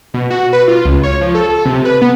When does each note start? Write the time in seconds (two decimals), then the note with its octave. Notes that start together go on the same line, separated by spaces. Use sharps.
0.14 B2
0.30 F#4
0.53 B4
0.68 F4
0.85 C#2
1.03 C#5
1.21 F3
1.35 A4
1.49 A4
1.65 C3
1.85 B4
2.01 B3